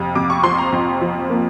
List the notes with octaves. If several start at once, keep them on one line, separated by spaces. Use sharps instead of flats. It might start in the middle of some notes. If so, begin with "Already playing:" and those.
Already playing: F2 C3
F2 D6
C#6
F3 C6
A#5
F2
F3
A#3